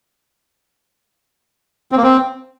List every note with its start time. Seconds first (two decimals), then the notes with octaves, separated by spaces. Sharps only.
1.92 C4
1.97 A#3
2.03 C4